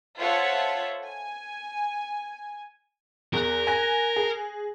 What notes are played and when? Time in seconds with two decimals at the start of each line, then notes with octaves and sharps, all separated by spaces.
0.17 F4 A4 C5 C#5 E5 F#5
1.06 G#5
3.33 E2 A#4 F#6
3.67 G#5 F#6 A#6
4.16 G#4